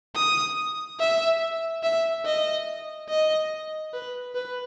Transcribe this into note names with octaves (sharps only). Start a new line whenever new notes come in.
D#6
E5
E5
D#5
D#5
B4
B4